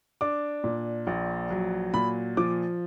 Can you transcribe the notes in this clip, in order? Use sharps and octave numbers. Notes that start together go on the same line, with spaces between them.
D4 D6
A#2
A#1
F#3
A#2 B5
F3 D6